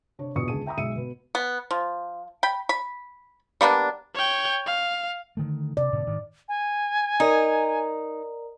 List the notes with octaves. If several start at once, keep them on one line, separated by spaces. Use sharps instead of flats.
C3 D4 C#5
A#1 E2 B2 C#6 D#6 C#7
C#2 D3 G#4 A5 D#7
E5 G5 A#5 B5 D#6
B1 G#3 E5 E6 C#7 D#7
B2 B4
B3
F3
G5 B5
B5
G3 A#3 B3 D4
C#5 G5
F5
D3 D#3 A3
C3 D5
G#2 B2 D3
G#2 D#3
G#5
D#4 A#4 D5 A#5